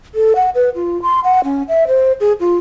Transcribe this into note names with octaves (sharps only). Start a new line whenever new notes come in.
A4
F#5
B4
F4
C6
F#5
C#4
E5
C5
G#4
F4